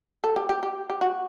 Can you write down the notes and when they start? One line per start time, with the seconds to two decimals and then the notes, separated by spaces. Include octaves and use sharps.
0.24 A4
0.36 G4
0.49 G4
0.63 G4
0.90 G4
1.01 F#4